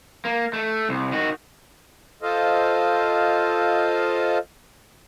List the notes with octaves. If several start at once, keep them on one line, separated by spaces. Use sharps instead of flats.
A#3
A3
C2
D#3 F#4
F4 A4 C5 D#5 F5